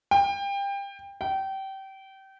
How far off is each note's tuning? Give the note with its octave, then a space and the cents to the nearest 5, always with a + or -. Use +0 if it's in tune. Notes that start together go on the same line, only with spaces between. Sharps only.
G5 +25
G5 -25